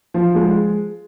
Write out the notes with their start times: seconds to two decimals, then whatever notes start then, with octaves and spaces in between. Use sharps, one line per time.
0.14 F3
0.35 G#3